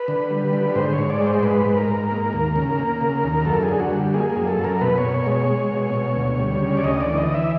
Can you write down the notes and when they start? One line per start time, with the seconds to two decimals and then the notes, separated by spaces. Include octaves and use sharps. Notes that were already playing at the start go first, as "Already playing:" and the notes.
Already playing: B4
0.08 D3
0.31 G3
0.53 D3
0.75 G#2 C5
0.93 C#5
0.98 G#2
1.10 D5
1.20 G#3
1.27 C5
1.43 G#2 B4
1.66 G#2
1.77 A#4
1.88 G#2
2.11 A#3
2.33 D#2
2.56 C#3
2.79 A#3
3.01 C#3
3.24 D#2
3.45 F#2 A4
3.63 G#4
3.69 D3
3.80 F#4
3.91 G3
4.14 A#3 G#4
4.30 G#4
4.36 F#2
4.47 A4
4.59 F#2
4.64 A#4
4.81 B2 B4
4.98 C#5
5.03 B2
5.14 C#5
5.26 G#3
5.32 C#5
5.49 G#3
5.71 B2
5.94 B2
6.16 D2
6.39 G3
6.61 C#3
6.77 D5
6.84 D2 D#5
7.01 D5
7.06 E3
7.18 D#5
7.29 E3
7.34 E5